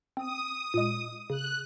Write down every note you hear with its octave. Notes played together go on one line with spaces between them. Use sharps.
C4 D#6
A#2 G#3
C#3 F#6